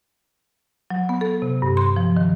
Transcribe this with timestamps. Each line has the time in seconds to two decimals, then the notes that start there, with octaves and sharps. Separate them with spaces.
0.90 F#3
1.09 B3
1.21 A4
1.42 C3
1.62 G2
1.77 C6
1.96 F3
2.17 D#3